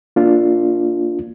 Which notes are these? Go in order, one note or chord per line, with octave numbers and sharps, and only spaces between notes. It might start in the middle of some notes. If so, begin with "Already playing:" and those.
A#3 D4 F4